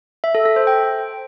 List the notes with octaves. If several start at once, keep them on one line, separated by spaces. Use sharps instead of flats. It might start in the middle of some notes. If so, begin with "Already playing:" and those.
E5
A4
A4
C5
G5